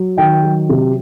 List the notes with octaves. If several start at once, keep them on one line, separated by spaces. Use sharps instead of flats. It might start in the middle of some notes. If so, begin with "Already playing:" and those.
Already playing: F#3
D#3 G5
F#3
C3